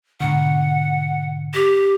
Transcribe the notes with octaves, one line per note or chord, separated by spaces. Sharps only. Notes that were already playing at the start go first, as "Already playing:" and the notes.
G#2 B2 D3 F#5
G4